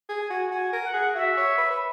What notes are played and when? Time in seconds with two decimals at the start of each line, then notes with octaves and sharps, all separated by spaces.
0.09 G#4
0.19 G#5
0.30 F#4
0.51 F#4 G#5
0.73 A#4
0.83 F#5
0.93 G#4
1.15 F#4 E5
1.37 C#5
1.58 B4
1.70 B4